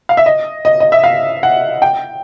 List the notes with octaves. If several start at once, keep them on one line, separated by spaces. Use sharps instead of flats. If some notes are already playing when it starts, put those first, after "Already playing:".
F5
E5
D#5
D#5
D#5
E5
F5
F#5
G5